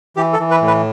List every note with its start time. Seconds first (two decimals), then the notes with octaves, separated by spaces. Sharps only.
0.16 E3 G4
0.33 A4
0.39 E3
0.51 B4
0.62 A2
0.68 B4